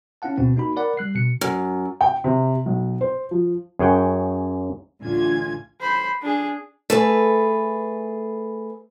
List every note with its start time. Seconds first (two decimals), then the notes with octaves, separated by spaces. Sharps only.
0.22 C#4 E4 F5 F#5 A5
0.38 D2 B2 C4
0.56 A#3 D#4 F#4 B5
0.76 A#4 D5 F#5 B5
0.97 G3 F#6 C7
1.15 B2 C#7
1.41 F#2
2.01 G5
2.24 C3
2.66 B1
3.01 C5
3.31 F3
3.79 F#2 G#4 C#5 F#5 G5
5.01 A1 D2 D3 F4 G#5 G#6
5.81 C5 B5
6.22 D4 G#4
6.90 A3 G#4 B4